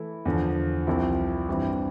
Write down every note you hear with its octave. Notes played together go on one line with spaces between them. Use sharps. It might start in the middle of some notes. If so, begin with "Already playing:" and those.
Already playing: E3 A3 E4 A4
E2 D3 F3
C2 C3 F3 C4 E4
G2 E3 G3 C4 E4